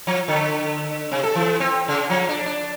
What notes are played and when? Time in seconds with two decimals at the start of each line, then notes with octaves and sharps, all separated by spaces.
0.07 F3
0.28 D3
1.12 C3
1.23 A4
1.35 E3
1.60 C4
1.88 C#3
2.10 F3
2.29 D4
2.46 D4